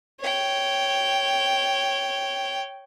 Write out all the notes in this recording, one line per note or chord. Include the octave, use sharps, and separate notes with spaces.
C#5 G5